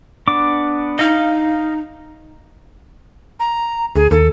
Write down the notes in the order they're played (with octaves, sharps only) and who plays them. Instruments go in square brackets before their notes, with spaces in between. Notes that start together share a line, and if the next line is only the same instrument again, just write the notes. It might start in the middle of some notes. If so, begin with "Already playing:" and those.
[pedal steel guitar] B3 D4 D6
[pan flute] D#4 [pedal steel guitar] D#5 F5
[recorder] A#5
[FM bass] D2 [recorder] G#4
[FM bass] D#2 [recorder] A4